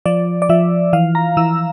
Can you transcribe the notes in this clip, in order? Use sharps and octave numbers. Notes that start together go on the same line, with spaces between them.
F3 D5
D5
F3 E5
E3 F5
A#5
E3 E6